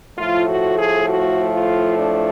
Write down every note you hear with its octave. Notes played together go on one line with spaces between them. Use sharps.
A2 F3 A3 F4
F#4
G#4
F#4
F4
D4